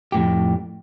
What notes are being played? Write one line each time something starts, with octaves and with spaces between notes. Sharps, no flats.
F2 A2 G4